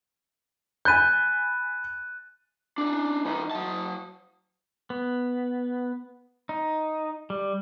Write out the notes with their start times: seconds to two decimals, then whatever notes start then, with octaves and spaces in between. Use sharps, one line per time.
0.85 G#5 B5 F#6 G6 A6 D#7
2.78 D4 D#4
3.25 E3 D#4
3.51 F#3 A5
4.90 B3
6.49 D#4
7.30 G3